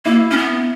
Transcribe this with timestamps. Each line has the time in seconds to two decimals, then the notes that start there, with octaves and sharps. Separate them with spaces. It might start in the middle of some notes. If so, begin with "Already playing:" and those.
0.05 A#3 E4
0.31 C#4
0.37 B3